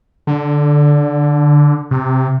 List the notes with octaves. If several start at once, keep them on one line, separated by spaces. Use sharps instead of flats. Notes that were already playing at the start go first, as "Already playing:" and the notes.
D3
C3